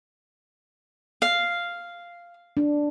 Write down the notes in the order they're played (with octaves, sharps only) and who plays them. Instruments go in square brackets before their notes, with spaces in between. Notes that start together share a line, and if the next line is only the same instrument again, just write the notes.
[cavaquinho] F5
[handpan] D4